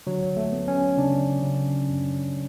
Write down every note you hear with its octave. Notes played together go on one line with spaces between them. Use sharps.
D3 F#3
A3
B3
C#4
C#3 D4
C#3
F#2